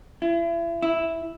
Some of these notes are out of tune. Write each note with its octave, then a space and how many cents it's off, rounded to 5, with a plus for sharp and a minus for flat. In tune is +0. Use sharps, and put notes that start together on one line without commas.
E4 +35
E4 -5